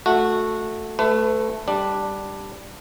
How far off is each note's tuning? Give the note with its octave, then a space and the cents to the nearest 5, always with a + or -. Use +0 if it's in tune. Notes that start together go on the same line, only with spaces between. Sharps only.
A3 +0 F#4 -15
A3 +0 B4 +30
G3 +0 D4 +5